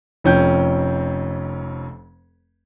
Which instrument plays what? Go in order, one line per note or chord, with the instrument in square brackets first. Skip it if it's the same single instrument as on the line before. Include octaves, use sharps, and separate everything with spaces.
[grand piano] F1 F2 C#4 G5 G6